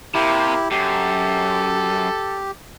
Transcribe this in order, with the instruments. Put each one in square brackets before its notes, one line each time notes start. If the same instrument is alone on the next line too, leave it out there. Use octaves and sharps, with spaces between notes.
[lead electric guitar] C3 [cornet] A#3 [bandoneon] E4 G4
[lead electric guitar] F#2 [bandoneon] G4 [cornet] A4